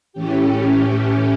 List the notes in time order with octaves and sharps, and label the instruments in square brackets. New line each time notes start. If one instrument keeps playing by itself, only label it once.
[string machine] A2 E3 A3 C#4 G4